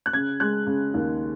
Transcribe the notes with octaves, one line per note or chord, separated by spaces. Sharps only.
F#6
C#3 G#6
G#3 F#6
C#3
D#2